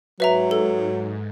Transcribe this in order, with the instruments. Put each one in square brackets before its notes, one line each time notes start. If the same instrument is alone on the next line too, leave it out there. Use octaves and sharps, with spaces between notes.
[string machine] G#2 [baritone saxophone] F#3 [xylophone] B4 E5 A#5
[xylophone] A4